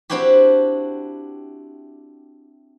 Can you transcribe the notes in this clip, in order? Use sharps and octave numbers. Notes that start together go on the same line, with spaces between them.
C4 D4 E4 F#4 G4